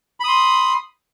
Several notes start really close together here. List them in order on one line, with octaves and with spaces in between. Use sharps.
B5 D#6 C6